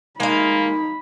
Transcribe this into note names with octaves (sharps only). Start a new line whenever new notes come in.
G#3 A#3 D#4 F5 B5